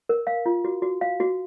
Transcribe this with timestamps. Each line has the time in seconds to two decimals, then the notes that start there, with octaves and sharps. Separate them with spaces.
0.09 A#4
0.27 F5
0.46 F4
0.65 F#4
0.82 F#4
1.01 F5
1.20 F#4